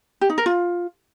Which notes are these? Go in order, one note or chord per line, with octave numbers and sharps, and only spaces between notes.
G4
D#4
A#4
F4